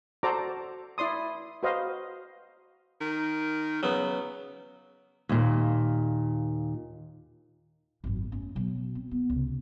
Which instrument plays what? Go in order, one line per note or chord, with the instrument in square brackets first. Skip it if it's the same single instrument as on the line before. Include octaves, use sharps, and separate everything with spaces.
[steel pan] F#4 A4 C5 D5 A#5 D6
E4 D5 C6 D#6
F#4 B4 C5 D#5 F5
[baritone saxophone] D#3
[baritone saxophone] C#3 [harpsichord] F#3 B3
[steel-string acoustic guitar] D#2 A#2
[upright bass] G#1 F#2
A3 C#4
B2 F#3
C4
B3
C#2 C3